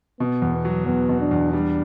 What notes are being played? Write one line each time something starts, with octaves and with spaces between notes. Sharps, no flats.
B2 B3
E2
B3
F#3
E2 B3
B2
D4
E2
G3 D4